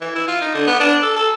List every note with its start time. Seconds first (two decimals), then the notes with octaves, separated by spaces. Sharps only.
0.01 E3
0.15 E4
0.28 F4
0.41 D#4
0.54 D3
0.67 B3
0.80 D4
1.03 A4
1.16 A4